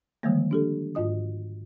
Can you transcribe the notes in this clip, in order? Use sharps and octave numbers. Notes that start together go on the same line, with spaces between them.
D3 D#3 F3 G3 G#3 A#3
D4 G4 A4
G#2 F4 D#5 D#6